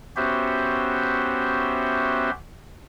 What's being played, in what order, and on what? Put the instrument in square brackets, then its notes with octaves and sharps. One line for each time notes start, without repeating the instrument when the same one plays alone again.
[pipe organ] B3 C#4 F#4 G4 C5 E5